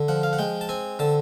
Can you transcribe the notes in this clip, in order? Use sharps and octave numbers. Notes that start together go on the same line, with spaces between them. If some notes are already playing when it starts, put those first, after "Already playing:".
Already playing: D3
F3 F#5
F5
F#5
G#3 G5
A5
C4 G#5
D3 A5